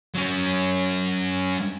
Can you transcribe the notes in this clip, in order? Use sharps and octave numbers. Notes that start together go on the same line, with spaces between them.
F#3 C#4